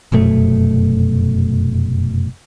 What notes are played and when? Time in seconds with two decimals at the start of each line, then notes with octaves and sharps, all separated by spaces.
0.12 F1 F#2 B2 A3